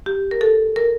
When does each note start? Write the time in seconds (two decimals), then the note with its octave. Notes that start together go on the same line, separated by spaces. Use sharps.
0.06 G4
0.31 A#4
0.41 A4
0.76 A#4